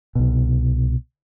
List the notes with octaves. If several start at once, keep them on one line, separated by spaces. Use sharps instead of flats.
C2 B2